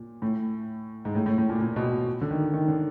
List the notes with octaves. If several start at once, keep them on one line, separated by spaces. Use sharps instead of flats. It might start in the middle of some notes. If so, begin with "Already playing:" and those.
Already playing: A#2
A2
G#2
A2
A2
A2
A#2
A#2
B2
D3
D#3
D#3
D3